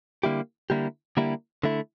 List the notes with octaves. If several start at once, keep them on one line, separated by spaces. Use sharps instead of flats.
D3 G3 A#3 E4 G4
D3 G3 A#3 E4 G4
D3 G3 A#3 E4 G4
D3 A3 E4